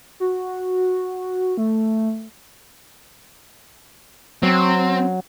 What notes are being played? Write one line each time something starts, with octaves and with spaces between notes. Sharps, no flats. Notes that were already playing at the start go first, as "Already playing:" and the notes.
F#4
A3
F#3 C4